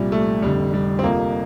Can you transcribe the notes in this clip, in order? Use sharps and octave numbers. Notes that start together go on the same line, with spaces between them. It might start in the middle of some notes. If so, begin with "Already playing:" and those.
Already playing: C2 A#2 F3 G3
A3
F1 F2 D3 G3
G3
C4
F1 F2 C3 F3 A#3